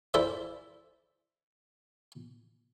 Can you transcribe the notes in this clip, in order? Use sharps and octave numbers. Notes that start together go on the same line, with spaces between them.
E4 A4 C5 D5 E5